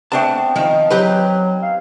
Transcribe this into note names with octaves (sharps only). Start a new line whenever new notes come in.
A3 B3 C4 D4 A5
D#3 F3 D#5 F5
F#3 D#4 G4 B4
F5